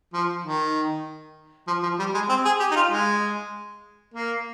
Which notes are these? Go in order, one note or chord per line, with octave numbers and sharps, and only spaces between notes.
F3
D#3
F3
F3
G3
G#3
C4
G#4
G4
D#4
F4
G#3
A#3